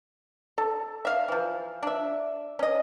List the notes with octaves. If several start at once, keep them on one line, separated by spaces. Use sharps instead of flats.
A4
E5 F5
E3 F3
D4 E5
C#4 D#5